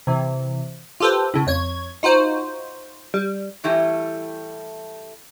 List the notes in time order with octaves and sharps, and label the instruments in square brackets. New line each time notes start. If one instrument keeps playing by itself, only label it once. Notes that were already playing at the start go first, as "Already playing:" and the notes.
[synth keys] C3 E3
[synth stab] F4 G4 A4 B4 C5
A2 C#3
F2 C#5 G#6
D#4 F4 F#4 C5
G3
[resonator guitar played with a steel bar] A2 E3 G3 A3 E4 G4